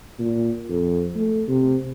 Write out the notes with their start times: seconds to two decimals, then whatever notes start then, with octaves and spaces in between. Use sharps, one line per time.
0.19 A#2
0.69 F2
1.15 A3
1.48 C3